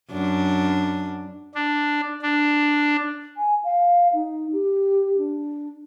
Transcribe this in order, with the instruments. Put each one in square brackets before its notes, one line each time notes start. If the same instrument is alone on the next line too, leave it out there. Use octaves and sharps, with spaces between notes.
[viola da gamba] F#2 D4
[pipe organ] D4
D4
[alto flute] G#5
F5
D#4
G4
D4